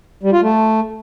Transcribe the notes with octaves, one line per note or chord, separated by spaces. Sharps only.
G3
F4
A3